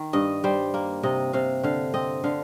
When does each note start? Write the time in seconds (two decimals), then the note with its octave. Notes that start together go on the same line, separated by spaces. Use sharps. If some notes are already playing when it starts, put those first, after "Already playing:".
Already playing: D#3
0.13 G2 D#5
0.44 G3 C5
0.74 A#3
1.03 C3 D#5
1.33 C3 F5
1.63 D3 F5
1.94 C4 D#5
2.24 D3 F5